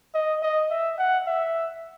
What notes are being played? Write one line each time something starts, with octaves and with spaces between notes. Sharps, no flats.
D#5
D#5
E5
F#5
E5